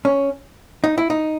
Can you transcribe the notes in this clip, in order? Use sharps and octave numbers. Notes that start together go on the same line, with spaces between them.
C#4
D#4
E4
D#4